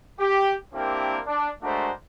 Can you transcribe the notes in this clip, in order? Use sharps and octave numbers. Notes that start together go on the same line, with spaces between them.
G4
A#3 C4 D4 E4 G4 A#4
D4
G#3 A3 D4 F#4 A#4 C5